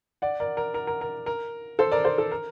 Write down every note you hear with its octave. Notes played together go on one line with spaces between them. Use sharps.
D5 F#5
A#4 D5
A#4
A#4
A#4
A#4
A#4
A4 C5
A#4 D5
A4 C5
A4
A#4